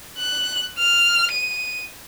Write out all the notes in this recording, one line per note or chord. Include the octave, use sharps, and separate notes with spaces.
F#6
F6
D#7